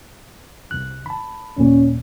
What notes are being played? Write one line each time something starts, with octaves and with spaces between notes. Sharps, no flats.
C2 F#6
A5 B5
D#2 A#2 C#4